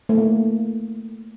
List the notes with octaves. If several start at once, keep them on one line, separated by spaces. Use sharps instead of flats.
A3
A#3